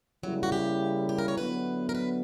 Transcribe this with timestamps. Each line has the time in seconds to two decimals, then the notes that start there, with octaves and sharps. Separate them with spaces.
0.23 C#3 F#3 G3 A#3 E4
0.43 F#4
0.52 G4
1.09 G4
1.18 A#4
1.28 C#5
1.37 D3 F#3 B3 E4 B4
1.89 A#4
1.95 B4